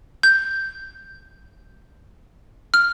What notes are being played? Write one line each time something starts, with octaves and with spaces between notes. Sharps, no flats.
G6
F6